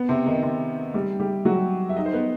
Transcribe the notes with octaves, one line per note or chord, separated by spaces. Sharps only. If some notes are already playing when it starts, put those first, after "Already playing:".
Already playing: B3
C3 C4
D#3 D#4
C3 C4
G3 G4
G3 G4
F#3 F#4
E5
D#4 D#5
C5
B3 B4